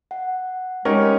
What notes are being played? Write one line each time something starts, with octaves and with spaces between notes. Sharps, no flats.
F#5
G#3 C#4 D#4 G4 A#4